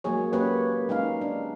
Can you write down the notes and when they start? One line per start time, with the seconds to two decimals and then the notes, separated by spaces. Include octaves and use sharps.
0.04 F#3 G#3 A#3 G#4 C#5
0.33 A#3 C#4 G4 B4 C#5
0.89 G#3 C#4 D#4 F5
1.21 D4